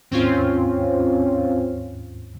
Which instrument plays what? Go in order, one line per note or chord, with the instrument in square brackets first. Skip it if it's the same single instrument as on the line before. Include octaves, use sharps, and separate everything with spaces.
[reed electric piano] D#2 G#2 [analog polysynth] C4 C#4 F4